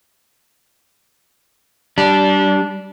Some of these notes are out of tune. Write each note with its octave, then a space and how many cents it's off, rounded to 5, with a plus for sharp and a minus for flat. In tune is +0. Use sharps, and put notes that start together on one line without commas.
G3 -25 D4 -10